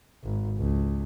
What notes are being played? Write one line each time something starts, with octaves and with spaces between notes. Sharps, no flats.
G#1
C#2